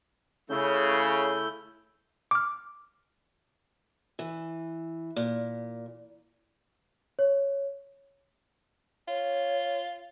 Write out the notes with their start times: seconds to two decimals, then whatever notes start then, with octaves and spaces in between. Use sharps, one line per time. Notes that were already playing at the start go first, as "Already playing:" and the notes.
0.50 C#3 A3 E4 G6
2.31 D6 F6
4.19 E3
5.16 A#2
7.19 C#5
9.08 F4 C#5